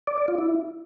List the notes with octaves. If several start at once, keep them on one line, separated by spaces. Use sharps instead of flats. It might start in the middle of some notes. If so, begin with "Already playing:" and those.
D5
D5
F4
E4